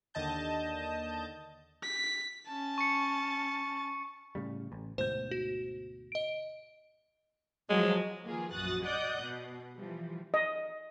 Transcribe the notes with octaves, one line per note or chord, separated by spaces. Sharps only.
D#2 D3 D#5 A5 G6
B6
C#4 A5
C#6 C#7
A2 C#3 G3
A1
D2 G#2 B2 C5 G6
F#4
D#5 D7
F3 F#3 G#3
D#3 F3 A#3 F4 G#4 B4
A#1 F#2 F#4 D#6 F#6 A6
D5 D#5 F#5 D#6 F#6 G6
B2
E3 F3 G3
D#5